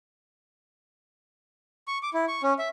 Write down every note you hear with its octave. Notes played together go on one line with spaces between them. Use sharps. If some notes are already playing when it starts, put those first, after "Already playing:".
C#6
D6
E4
C#6
C#4
E5